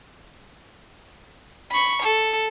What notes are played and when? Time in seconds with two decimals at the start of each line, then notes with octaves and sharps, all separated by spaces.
1.72 B5 C#6
2.02 A4